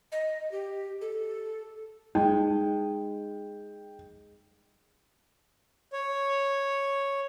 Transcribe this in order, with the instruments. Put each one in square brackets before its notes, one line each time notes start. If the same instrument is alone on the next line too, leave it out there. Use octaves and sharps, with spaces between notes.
[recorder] D#5
G4
A4
[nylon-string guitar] G#3 [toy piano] D#4 [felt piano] G5
[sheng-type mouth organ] C#5